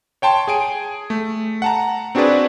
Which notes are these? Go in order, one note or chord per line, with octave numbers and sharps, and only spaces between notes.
C#5 G5 A5 C6
G#4 G#5 D7
A3
F#5 A5 A#5
C4 D4 F#4 G#4 B4 D5